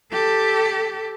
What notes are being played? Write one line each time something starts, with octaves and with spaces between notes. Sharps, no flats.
G4 A4